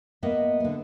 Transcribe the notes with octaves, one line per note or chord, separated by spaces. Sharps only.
A#3 B3 D#5 E5
D3 B3